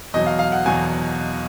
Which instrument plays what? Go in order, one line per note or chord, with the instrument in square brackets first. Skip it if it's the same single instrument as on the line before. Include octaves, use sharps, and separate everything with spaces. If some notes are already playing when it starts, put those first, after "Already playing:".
[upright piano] E2 B2 F#3 D#5
F5
F5
F#5
E2 B2 F#3 G#5